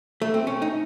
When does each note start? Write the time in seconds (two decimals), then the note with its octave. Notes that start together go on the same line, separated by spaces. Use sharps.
0.22 A3
0.34 C4
0.47 C#4
0.62 D#4